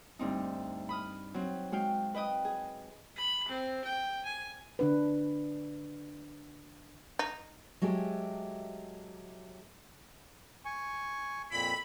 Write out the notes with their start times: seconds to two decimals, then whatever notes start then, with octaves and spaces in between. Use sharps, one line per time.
0.19 D2 G2 C4 D#4
0.89 B5 D#6 F6
1.34 F#3 C4
1.72 G#3 F#4 F5 G5
2.14 B4 D#5 G5 D#6
2.45 G#4
3.16 B5
3.48 C4
3.84 G5
4.25 G#5
4.79 D3 D4 B4
7.19 D#4
7.82 F#3 G#3 A3 G4
10.65 G#5 C#6
11.51 F2 A#2 E4 B5